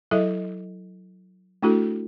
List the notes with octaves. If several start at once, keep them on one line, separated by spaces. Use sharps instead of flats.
F#3 E4 A4 D#5 E5
A3 D4 E4 F#4 A4